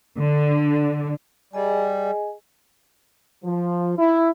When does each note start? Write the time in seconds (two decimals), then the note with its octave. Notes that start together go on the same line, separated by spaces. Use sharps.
0.19 D3
1.53 G3 G#4 D#5 G#5
3.44 F3
3.97 E4